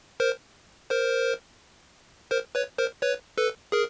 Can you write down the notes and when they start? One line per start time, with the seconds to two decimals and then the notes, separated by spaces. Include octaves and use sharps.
0.20 A#4 C5
0.90 A#4 C5
2.31 A#4 C5
2.55 B4 C#5
2.78 A#4 C5
3.02 B4 C#5
3.38 A4 B4
3.72 G#4 A#4